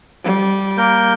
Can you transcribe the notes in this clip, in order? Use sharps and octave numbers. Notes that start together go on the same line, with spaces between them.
G3
A#3 A#4 G6